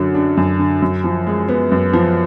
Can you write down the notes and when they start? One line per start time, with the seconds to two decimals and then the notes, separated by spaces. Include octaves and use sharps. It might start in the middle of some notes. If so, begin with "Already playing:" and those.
Already playing: F#2 D3 F#3
0.15 D4
0.37 F#2
0.59 D3
0.82 F#2
1.04 F3
1.27 G#3
1.49 B3
1.72 F#2
1.94 F3